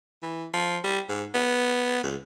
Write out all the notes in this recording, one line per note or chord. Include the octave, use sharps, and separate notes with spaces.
E3
F3
G3
G#2
B3
C#2